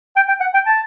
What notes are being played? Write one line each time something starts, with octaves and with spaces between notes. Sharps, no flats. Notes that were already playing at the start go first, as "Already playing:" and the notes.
G5
G5
F#5
G5
A5